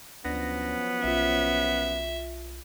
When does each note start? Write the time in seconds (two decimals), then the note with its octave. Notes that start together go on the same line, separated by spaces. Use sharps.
0.25 D2 F3 F#3 B3 C#4 D4 A#6
1.04 B1 F4 E5